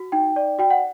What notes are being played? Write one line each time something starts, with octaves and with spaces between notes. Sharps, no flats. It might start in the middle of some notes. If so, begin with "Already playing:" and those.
Already playing: F#4
D#4 G5
D5
F#4 G5
F#5